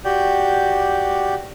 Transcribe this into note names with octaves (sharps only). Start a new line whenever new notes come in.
F#4 G4 D5 G6